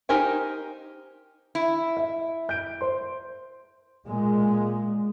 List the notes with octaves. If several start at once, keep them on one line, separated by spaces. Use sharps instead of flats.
D#4 G4 A#4 C5 G#5
E4
E5
G6 D7
C5 C6
A#2 G#3